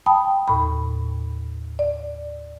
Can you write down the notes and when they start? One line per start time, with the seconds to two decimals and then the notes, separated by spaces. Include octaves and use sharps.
0.06 G5 A5 B5 D#6
0.48 D#2 A2 B5
1.79 D5